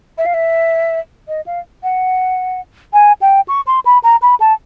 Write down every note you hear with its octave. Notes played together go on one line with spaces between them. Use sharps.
E5
F5
E5
D#5
F5
F#5
G#5
G5
C#6
C6
B5
A#5
B5
A5